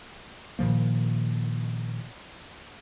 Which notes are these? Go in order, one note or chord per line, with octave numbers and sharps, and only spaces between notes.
A#2 D#3 F3 A#3